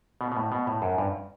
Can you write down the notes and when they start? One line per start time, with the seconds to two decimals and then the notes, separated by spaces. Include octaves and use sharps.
0.21 B2
0.32 B2
0.37 A2
0.52 B2
0.67 A2
0.82 F#2
0.98 G2